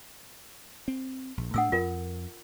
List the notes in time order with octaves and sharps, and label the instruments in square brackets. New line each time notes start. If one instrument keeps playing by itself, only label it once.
[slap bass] C4
A#1
[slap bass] A2 A3 D4 [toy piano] F#5 D#6 E6
[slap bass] F2 [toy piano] F4 A#4